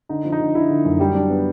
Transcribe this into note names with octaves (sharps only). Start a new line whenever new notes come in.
D3 D#4
F3
D#4
D3
D3 E4
D3
F#2
F#3 G3 G4
D4
B3